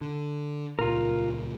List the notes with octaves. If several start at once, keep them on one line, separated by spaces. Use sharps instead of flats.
D3
D#1 C#2 A#2 F4 A#4